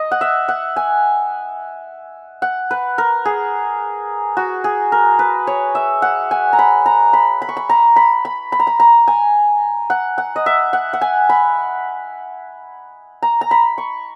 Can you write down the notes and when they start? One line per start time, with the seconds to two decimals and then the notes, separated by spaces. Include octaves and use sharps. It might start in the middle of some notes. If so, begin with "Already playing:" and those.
Already playing: D#5
0.11 F#5
0.21 E5
0.48 F#5
0.76 G#5
2.42 F#5
2.71 B4
2.98 A#4
3.25 G#4
4.37 F#4
4.64 G#4
4.92 A#4
5.19 B4
5.47 C#5
5.75 E5
6.02 F#5
6.31 G#5
6.53 A#5
6.59 B5
6.86 A#5
7.13 B5
7.42 B5
7.49 C#6
7.57 B5
7.69 A#5
7.96 B5
8.25 B5
8.52 B5
8.60 A#5
8.67 B5
8.80 A#5
9.08 G#5
9.90 F#5
10.18 F#5
10.36 D#5
10.46 E5
10.73 F#5
10.93 F#5
11.01 G#5
11.29 B5
13.23 A#5
13.41 A#5
13.51 B5
13.78 C#6